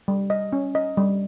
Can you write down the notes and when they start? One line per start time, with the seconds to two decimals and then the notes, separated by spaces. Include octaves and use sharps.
0.08 G3
0.30 D#5
0.53 C#4
0.75 D#5
0.97 G3